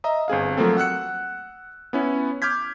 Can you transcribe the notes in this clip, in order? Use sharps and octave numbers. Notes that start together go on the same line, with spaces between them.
D#5 E5 A#5 D#6
G1 C4 G#4 F5
F3 F#3 A3 A#3 C4 A4
F#5 E6 F#6 C#7
B3 C#4 E4
D6 F6 G6 G#6 B6